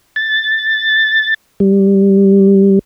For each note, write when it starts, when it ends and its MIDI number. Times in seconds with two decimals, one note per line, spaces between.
0.16 1.34 93
1.60 2.79 55